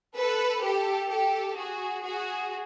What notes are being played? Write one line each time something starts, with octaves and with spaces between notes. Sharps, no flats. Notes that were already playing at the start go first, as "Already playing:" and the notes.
A4 B4
G4 A4
G4 A4
F#4 G#4
F#4 G#4